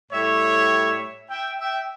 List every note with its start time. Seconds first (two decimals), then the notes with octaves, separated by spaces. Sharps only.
0.12 A2 G3 C#5 E5
1.30 E5 G5
1.60 E5 G5